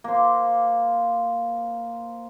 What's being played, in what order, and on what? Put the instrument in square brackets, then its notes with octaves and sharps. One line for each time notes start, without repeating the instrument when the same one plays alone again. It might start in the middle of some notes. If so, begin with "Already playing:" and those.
[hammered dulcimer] A#3 C5